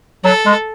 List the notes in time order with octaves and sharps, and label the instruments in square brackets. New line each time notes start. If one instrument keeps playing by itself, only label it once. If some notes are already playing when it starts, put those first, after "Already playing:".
[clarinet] F#3 [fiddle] A4
[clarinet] G#3